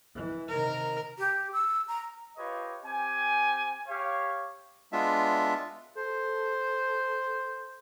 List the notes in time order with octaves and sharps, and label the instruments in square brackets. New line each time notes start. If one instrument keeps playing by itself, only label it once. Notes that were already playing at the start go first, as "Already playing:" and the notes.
[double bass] E3
[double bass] C3 D#3 [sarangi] A#4
[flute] G4
E6
A#5
[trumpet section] F4 G4 B4 C#5 D#5
C4 G4 G#5
G4 C#5 F5
[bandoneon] G#3 B3 D4 F4 E5
[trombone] A4 [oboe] C5